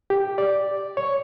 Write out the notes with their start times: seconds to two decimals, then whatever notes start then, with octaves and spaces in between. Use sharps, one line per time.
0.10 G4
0.38 D5
0.97 C#5